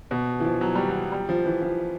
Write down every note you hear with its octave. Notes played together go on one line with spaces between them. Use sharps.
B2
E3
F3
F#3
G3
F#3
G3
F3
E3
F3